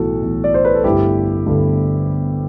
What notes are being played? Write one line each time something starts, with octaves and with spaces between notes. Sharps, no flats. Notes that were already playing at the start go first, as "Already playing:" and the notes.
Already playing: B1 A2 E3 F#4 A4
B1 A2 E3
D5
C5
B4
A4
G1 G2 D3 A3 E4 G4
G1 G2 D3 A3